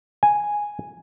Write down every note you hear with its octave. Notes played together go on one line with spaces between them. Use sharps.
G#5